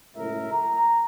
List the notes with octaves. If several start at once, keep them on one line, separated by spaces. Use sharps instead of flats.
F#1 C#2 A2 A#4 E5
A#5